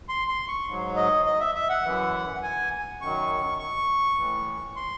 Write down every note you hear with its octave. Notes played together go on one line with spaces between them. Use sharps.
C6
C6
C#6
G#2 F#3
D#5
D#5
E5
E5
F#5
F#2 E3
G#5
F#2 D#3 F#3 C#6
C#6
A2 E3
C6